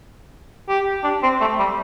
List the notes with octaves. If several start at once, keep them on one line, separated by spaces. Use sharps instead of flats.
G4
D4
C4
A3
G3